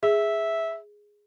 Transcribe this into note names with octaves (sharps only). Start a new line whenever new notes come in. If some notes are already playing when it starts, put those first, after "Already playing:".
G#4 E5